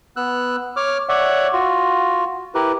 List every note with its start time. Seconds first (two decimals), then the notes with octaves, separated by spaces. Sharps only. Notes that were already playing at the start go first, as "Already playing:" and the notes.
0.16 B3 E6 F#6
0.76 C#5 D6 F6
1.09 C#5 D5 E5 F#5
1.53 F4 F#4
2.55 E4 G4 A#4 B4